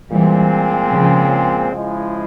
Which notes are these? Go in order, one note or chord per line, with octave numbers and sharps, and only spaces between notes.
A#2 E3 G3 G#3 C4
C#3 F3
C#3 F3 G#3 E4